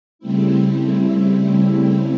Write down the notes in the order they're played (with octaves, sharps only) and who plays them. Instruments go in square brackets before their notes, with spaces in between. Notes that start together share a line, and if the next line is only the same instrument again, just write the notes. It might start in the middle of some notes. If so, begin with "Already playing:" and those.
[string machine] C#3 G3 A3 C4 E4